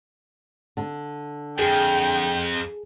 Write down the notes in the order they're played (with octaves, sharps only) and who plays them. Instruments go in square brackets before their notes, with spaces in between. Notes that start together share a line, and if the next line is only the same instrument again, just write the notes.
[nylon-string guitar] D3
[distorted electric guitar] F2 [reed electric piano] G#4 [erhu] G5